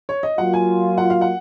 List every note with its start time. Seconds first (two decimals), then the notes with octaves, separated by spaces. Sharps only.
0.09 C#5
0.23 D#5
0.38 F#3 A#3 F4 F#5
0.53 G#5
0.98 F#5
1.10 F5
1.21 F#5